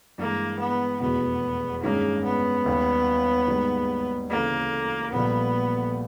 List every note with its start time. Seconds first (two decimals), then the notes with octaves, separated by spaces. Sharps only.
0.18 G2 E3 G#3 A#3
0.59 B3
1.00 F1 E2 B2 B3
1.83 G2 D#3 G#3 A#3 C#4
2.24 B3
2.66 D#2 D#3 G3
3.48 G#2 D#3 G3 A#3 D#4
4.30 D2 C#3 E3 A#3
5.12 A#1 A#2 G3 B3